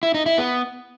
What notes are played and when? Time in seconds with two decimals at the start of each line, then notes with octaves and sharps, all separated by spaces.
0.03 E4
0.14 D#4
0.26 E4
0.38 B3